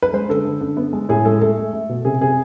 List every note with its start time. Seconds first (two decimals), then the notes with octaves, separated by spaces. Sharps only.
0.03 B4
0.13 G#3 C5
0.29 D3 A4
0.45 D3
0.61 D3
0.77 B3
0.93 G#3
1.09 A2 G#4
1.25 G#3 A4
1.41 A3 A4
1.57 A3
1.73 A3
1.89 B2
2.05 C3 G#4
2.21 C3 G#4